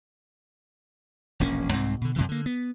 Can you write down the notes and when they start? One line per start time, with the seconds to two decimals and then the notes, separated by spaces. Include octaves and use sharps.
1.40 E1 A#1 A#3 C#4
1.73 C2 G#2 C4
2.01 B2 D3
2.16 F#2 C3 E3
2.29 D3 A#3
2.46 B3